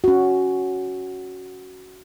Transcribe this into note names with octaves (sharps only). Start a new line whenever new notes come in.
C#4 F#4